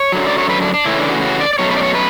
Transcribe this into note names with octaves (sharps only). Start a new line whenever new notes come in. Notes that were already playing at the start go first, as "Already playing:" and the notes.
Already playing: C#5
F#2 D3 F#3
D5
C#5
B4
D4
D4
C#3 E3 A3 C#4 E4
D4
F#4
F#4
D5
D5
B2 F#3 A3 C#4 C#5
B4
D5
C#5
B4